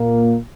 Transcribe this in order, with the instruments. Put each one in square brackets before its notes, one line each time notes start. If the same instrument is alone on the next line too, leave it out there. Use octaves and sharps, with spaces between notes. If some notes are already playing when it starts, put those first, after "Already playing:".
Already playing: [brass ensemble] A#2 A#3